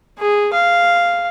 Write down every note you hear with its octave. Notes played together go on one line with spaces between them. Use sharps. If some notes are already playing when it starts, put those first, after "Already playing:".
G#4
F5